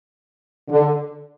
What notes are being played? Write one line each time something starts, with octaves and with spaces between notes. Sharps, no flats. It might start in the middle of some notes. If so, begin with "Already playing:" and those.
D3